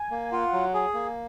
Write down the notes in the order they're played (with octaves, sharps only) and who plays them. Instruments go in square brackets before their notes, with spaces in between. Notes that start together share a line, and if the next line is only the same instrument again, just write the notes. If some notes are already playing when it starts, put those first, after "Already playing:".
Already playing: [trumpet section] G#5
[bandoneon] A#3
[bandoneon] F4 [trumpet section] F#5
[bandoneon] F#3
[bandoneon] G#4 [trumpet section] G#5
[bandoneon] A#3